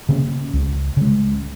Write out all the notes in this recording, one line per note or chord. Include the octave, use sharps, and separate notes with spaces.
C#3 A#3 C#4
C#2
C#3 G#3